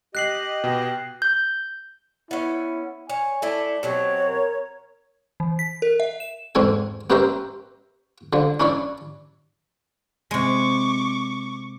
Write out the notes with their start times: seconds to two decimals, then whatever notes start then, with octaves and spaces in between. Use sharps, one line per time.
0.15 G4 D#5 F#6 C7 F#7
0.64 B2 G5
1.22 G6
2.31 B3 C#4 E4
3.09 C#5 G#5
3.42 A3 E4 A4 D5
3.83 B2 F#3 C4 G4 C#5
4.27 A#4
5.40 E3
5.59 B6
5.82 A#4
6.00 E5
6.20 E7
6.55 E2 G#2 C4 A4 G#5
7.10 B3 C#4 G4 A#4 C5 E5
8.33 D3 F3
8.60 C#4 D4 E4 C#5 D5
10.31 C3 G#3 C#6 D6